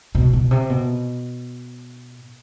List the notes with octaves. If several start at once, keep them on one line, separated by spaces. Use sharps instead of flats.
B2
B2
C3
B2